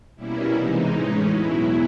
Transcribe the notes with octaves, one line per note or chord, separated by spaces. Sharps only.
B2 G3 A#3 C#4 E4
C3 E3 G#3 D#4
A2 E3 G#3 C#4
E2 B2 F#3 E4